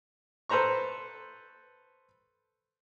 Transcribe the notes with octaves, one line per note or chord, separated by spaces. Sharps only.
A4 B4 C5 A#5 C#6